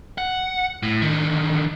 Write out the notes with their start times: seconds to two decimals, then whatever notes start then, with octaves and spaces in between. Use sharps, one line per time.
0.18 F#5
0.83 A2
1.02 D3 D#3